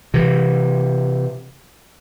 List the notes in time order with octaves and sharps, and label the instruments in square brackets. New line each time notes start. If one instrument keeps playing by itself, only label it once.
[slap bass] C3 E3